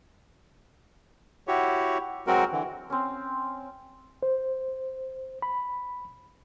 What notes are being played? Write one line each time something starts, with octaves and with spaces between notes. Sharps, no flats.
E4 F#4 G4 C#5
F#3 G#3 C4 F#4 A#4
D3 E3
C4 C#4
C5
B5